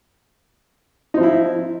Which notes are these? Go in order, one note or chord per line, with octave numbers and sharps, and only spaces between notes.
F3 C4 D#4 E4